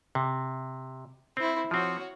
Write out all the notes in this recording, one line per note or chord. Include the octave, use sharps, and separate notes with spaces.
C3
C4 E4 C5
F3 C4 F#4 C#5